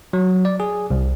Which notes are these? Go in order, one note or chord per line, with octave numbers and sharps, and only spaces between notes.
F#3
D5
G#4
C2